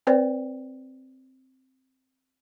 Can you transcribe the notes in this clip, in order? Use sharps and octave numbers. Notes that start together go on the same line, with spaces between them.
C4 B4 C5 D5 G5